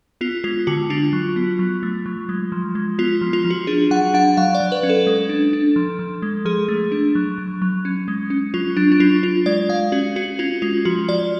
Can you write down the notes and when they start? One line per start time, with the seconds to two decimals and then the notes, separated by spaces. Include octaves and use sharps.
0.21 B3 F4
0.44 G#3 F4
0.67 D3 F#4
0.90 D4 F4
1.13 F#3
1.36 B3
1.59 F#3
1.83 A3
2.06 F#3
2.29 G#3
2.52 F3
2.75 G#3
2.98 B3 F4
3.21 F3
3.33 F4
3.45 F3
3.50 F#4
3.67 D4 G#4
3.91 F#3 F#5
4.14 D4 F#5
4.37 F#3 F5
4.55 D5
4.60 F#3
4.72 B4
4.83 C#4
4.90 A4
5.07 G#3
5.29 D4
5.53 D4
5.76 F3
5.99 F3
6.22 G#3
6.45 F3 G#4
6.68 A3
6.92 D4
7.15 F#3
7.38 F#3
7.62 F#3
7.85 C#4
8.08 G#3
8.30 C#4
8.54 F#3 F4
8.77 F#3 D4
8.92 D4
9.00 F#3 F4
9.23 D4 F4
9.46 G#3 D5
9.69 G#3 F5
9.92 C#4 F#4
10.16 C#4 F#4
10.39 C#4 F4
10.62 G#3 F4
10.85 F3 F#4
11.09 F3 D5